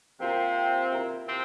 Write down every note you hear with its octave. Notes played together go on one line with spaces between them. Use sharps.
C3 A#3 C4 F4 A#4
E4 A#4 E5
C3 C4